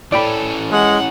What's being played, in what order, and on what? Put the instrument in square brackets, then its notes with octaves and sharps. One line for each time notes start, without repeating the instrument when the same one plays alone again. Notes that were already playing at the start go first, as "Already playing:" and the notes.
[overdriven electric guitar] E3 C#4 [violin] A4 [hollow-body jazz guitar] D5 G5 B5
[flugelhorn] G#3 [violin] F#5